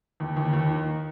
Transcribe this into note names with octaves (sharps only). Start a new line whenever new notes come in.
D#2
D#2
D#2
D#3